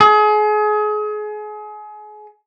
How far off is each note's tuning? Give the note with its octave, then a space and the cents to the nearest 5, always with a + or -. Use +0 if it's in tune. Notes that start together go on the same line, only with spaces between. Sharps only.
G#4 +30